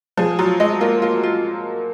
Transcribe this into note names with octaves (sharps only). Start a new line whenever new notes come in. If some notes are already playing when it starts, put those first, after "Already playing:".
F3 G#4
F#3 F4
G#3 D#5
A#3 F4
A#3 F4
F4